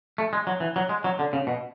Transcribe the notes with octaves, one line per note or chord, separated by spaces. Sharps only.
A3
G#3
F#3
E3
F#3
G#3
F#3
D3
C#3
B2